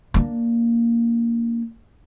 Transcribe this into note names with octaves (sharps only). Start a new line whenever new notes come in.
A#3 D4